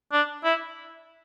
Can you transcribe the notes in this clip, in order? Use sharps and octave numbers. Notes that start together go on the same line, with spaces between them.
D4
E4